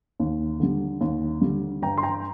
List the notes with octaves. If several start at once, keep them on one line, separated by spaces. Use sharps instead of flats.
D#2
D3 G3
D#2
D3 G3
G2 G5 A#5
C6
G5 A#5